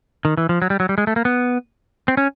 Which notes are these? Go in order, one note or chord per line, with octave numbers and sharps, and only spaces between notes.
D#3
E3
F3
F#3
G3
F#3
G3
G#3
A3
A#3
B3
C4
C#4